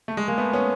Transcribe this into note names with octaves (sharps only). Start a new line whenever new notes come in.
A3
G#3
G#3 A#3
A3 B3
B3 C#4